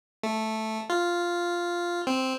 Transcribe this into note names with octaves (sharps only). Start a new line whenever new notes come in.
A3
F4
C4